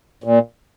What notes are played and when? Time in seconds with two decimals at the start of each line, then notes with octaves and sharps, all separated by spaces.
0.24 A#2